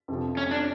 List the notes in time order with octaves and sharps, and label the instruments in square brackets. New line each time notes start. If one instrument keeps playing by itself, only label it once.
[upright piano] F2 C3 F3
[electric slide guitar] C#4
D4